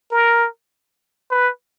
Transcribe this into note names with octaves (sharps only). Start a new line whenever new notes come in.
A#4
B4